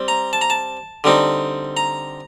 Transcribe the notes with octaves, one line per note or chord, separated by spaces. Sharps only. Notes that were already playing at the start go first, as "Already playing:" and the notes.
Already playing: G3 C4
A#5
A5
A#5
A5
D3 G3 C4 D#4
A#5